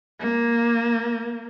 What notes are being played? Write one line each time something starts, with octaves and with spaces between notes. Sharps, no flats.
A#3